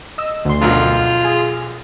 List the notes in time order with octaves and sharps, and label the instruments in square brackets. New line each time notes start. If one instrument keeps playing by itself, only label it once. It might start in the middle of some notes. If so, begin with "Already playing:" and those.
[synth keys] D#5 E6
D2 C6
[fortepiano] B1 F#2 F3 [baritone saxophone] F4
[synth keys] G#4